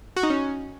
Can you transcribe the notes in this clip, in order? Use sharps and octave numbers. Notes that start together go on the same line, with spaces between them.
F#4
D#4
C#4